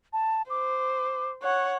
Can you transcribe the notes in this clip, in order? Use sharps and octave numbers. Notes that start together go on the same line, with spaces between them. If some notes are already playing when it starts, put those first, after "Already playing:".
A5
C5 D6
C#5 F#5 F#6